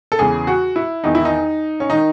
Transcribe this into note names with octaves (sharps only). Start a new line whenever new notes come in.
A4
E2 C#3 E3 G#4
F#4
E4
E2 D#3 D#4
E4
D#4
C#4
D#3 D#4